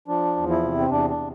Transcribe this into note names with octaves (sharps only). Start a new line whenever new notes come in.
F3 D4
E2
E4
C3
C4
E2 D4
D4
C3